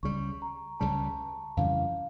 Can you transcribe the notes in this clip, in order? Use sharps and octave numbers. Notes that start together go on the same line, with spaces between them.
C#2 C#3 G3 C#6
A#5
C#2 C#3 G3 A5
F2 C#3 E3 G3 F5